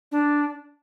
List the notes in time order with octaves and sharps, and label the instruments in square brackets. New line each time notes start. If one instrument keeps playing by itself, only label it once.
[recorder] D4